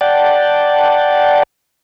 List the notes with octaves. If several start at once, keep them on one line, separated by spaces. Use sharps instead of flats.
D5 F#5 G5 A5